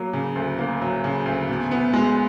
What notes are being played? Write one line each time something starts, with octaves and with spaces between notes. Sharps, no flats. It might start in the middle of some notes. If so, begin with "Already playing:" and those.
Already playing: F#3 A#3
C#3
D2
A#3
F#3
C#3
D2
B2
B3
G#3